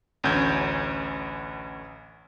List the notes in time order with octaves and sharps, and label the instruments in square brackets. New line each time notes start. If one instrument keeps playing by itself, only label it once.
[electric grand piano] A1 D2 C#4 G6 G#6